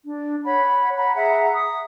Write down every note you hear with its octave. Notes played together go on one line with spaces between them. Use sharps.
D4
C#5 F#5 B5
F#5 A#5 B5
G#4 E5 F#5 A#5
D#6